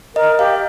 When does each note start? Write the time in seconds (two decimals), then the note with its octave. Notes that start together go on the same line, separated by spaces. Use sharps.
0.15 A#4 D#5
0.39 G4 F5